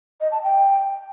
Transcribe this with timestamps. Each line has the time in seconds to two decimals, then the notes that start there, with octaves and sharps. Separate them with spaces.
0.21 D#5
0.32 A5
0.43 G5